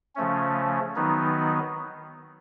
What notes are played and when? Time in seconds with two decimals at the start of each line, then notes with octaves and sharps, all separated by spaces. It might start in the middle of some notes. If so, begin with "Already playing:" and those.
0.15 C#3 F3 A3 C#4
0.96 D#3 F#3 B3 D#4